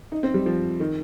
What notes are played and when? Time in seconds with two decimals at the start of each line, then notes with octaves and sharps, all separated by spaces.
0.12 D#4
0.23 C4
0.34 G3
0.46 F3
0.80 D#3